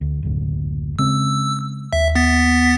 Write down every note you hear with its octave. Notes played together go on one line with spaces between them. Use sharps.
D2
F#1 D2 A2
C#3 G#3 C4 E6
D#2 E5
B3 A6 B6